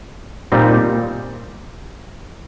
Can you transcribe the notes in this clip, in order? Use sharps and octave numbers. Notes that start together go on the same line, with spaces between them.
A#2 G3 C4 D#4